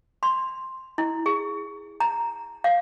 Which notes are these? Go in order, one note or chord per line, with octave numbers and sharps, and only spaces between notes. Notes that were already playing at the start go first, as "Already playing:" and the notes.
C6
E4
G#4
A#5
F5